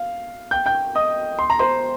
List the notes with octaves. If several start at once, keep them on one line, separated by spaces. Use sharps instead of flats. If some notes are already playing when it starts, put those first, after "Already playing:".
Already playing: F5
G5 G6
G5 G6
D#5 D#6
C6
A#5
C5 C6